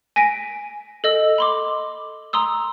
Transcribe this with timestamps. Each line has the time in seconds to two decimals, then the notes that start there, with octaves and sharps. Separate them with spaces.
0.16 G#5 A#6 B6 D7
1.04 A4 D#5 E6
1.38 B5 C6 D6
2.33 A#5 C6 D#6 E6